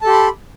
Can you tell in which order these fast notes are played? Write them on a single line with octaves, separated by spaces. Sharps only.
A5 A4 G4 C6 B5